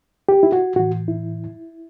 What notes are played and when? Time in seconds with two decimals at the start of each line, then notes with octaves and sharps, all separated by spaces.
0.29 G4
0.43 E4
0.52 F#4
0.76 A2 E3 F#4
1.08 E4